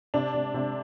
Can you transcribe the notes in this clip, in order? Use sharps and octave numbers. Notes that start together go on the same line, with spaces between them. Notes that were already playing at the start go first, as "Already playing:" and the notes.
C3 D4
C3
C3